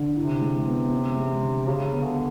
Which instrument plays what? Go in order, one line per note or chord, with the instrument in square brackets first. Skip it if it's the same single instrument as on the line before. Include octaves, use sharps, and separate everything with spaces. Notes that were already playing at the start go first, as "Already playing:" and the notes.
Already playing: [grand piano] D3
[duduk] C3 [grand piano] E4
[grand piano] G#3
B3
C#4
G#3
D3
[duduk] C#3 [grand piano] G4
[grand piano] B3
[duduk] D3